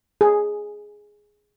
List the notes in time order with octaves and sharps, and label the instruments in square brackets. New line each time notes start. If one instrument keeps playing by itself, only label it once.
[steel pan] G#4